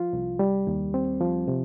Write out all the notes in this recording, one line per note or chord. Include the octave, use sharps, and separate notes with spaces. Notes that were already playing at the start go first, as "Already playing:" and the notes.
Already playing: F3 F4
C2
G3
D#2
C4
F3
C3